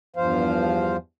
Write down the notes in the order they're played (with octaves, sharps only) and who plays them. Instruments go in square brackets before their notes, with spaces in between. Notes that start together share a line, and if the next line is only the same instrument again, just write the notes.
[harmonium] E2 G2 F3 C5 F5